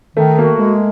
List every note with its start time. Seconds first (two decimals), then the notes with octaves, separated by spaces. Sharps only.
0.16 D#3 A3
0.38 A#3 F#4
0.58 G#3 A3